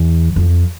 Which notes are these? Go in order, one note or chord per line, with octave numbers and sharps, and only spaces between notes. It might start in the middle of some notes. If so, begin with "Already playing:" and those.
Already playing: E2
F2